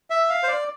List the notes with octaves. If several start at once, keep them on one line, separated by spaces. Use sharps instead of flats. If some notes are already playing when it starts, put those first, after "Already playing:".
E5
F5
C5
D5